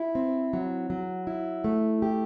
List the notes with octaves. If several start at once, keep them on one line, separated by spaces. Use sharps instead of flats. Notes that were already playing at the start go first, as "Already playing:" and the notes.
Already playing: E4
C4
F#3
F#3
E4
A3
G4